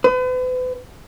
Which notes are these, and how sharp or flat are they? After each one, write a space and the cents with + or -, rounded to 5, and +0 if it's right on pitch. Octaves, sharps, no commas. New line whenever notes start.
B4 +40